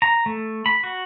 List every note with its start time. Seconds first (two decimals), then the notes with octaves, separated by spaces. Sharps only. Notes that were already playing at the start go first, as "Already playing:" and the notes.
0.02 A#5
0.26 A3
0.66 B5
0.83 F#4